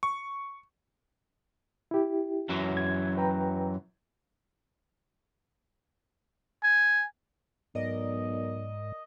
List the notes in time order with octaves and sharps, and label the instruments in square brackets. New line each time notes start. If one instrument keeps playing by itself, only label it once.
[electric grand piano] C#6
[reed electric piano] E4 G4
[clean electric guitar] F#2 E3 F#3
[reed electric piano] G#6
B4 G5 A#5
[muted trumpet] G#5
[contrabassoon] B1 [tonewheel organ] G#2 [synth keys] A#4 D5 [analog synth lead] D#5